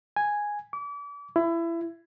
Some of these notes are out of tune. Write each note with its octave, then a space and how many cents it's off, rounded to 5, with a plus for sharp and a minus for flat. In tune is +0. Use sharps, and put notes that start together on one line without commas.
G#5 -5
D6 -35
E4 +25